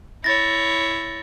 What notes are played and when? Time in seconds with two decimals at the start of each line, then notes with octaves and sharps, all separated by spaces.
0.24 E4 C#5 A6 A#6